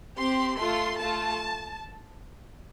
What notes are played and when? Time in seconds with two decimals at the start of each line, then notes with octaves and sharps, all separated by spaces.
0.19 C4 G4 C6
0.59 A3 F4 A4 C6
0.99 A3 F4 A4 A5